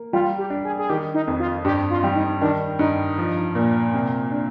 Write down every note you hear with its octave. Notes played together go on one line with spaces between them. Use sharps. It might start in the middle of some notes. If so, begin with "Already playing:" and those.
Already playing: A#3
G3 F4
G4
D4
G#4
G#4
D#3 G4
D#4
F2
F4
G2 G4
F4
G3
D#4
D#3 D4
G2 D#4
F3
A#2
C3
D4